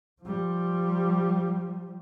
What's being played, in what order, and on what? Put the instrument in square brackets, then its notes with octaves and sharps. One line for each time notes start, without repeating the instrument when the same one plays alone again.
[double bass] F3 G3